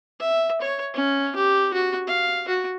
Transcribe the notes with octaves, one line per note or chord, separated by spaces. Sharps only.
E5
C#5
C#4
G4
F#4
F5
F#4